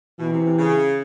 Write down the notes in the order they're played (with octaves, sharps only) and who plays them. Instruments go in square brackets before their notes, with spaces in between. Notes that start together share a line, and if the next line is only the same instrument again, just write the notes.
[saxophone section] B2 [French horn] E3
[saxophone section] C3
C3
C#3